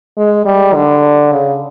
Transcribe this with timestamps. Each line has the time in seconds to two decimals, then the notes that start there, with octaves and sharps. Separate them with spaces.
0.17 G#3
0.45 G3
0.74 D3
1.32 C#3